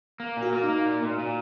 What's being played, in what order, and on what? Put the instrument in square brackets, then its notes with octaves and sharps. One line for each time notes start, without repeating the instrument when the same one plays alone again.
[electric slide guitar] A#3
A#2
[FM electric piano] F#4
[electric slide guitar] A#3
[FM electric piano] D#4
[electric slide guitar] A#3
A#2
A#2
A#2